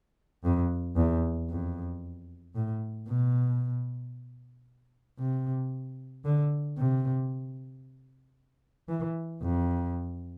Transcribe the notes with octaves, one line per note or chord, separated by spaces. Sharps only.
F2
E2
F2
A2
B2
C3
D3
C3
E3
F2